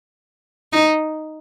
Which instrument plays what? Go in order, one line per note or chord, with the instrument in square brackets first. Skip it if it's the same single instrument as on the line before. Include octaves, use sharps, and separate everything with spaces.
[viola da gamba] D#4